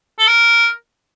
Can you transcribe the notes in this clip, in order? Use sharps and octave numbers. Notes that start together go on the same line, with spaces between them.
A4
A#4